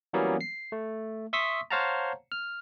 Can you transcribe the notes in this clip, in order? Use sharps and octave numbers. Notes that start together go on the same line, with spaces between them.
E3 F#3 G3 A#3 B3 C#4
C7
A3
E5 C6 C#6 D#6 E6 B6
C5 C#5 F5 F#5 A5 A#5
F6